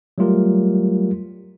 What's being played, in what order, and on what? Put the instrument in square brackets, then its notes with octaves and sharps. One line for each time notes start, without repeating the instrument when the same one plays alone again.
[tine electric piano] F#3 G3 A3 F4 G4 A#4